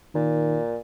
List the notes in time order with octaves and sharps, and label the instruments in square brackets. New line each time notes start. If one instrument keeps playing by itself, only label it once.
[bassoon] A#2 [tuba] D#3